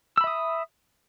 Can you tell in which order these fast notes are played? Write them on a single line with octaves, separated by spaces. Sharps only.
E6 B5 E5 D#6